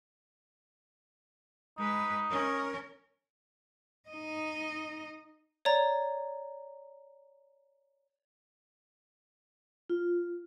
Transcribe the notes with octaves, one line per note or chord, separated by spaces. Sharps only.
G#3 D#4 B4
C#4 A#4
D#4 D#5
C#5 D5 A#5
F4